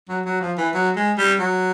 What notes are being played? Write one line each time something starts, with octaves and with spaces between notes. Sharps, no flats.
F#3
F#3
F3
E3
F#3
G#3
G3
F#3